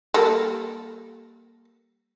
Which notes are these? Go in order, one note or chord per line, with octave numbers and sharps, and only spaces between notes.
G3 A#3 A4